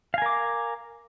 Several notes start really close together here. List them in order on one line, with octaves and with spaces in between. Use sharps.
F5 G#5 A#4 D6